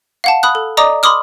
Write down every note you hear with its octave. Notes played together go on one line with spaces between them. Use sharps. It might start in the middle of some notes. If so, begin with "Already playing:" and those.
F5 F#5 A5
B5 D#6 F#6
A4
D5 D#5 A#5 D6 D#6
B5 C6 D6 D#6 F6